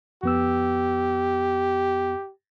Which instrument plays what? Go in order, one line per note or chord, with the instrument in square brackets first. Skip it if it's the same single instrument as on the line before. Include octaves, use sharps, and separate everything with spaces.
[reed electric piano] F2 B3 E6 [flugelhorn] G4